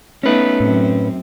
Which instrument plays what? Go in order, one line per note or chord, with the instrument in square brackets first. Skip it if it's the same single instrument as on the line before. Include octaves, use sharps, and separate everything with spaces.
[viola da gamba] A3 B3 D#4 [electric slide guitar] C#4 B4
[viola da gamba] F#2 C4 [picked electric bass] A2